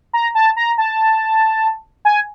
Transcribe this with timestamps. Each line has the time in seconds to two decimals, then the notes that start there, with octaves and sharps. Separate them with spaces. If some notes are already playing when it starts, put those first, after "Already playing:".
0.13 A#5
0.35 A5
0.57 A#5
0.78 A5
2.05 G#5